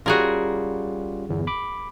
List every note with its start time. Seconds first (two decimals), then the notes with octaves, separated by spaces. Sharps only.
0.06 G3 C#4 F4 F#4 G#4 A#4
1.29 G1 E2
1.47 B5 D6